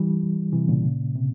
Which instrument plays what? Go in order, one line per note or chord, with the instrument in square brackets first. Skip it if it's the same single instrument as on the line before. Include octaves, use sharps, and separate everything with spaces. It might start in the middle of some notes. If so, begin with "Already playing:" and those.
Already playing: [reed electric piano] E3 G3
C3 E3
A#2 C#3
C3